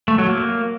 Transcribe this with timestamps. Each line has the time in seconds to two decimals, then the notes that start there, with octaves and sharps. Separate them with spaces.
0.08 A3
0.18 F#3
0.29 A#3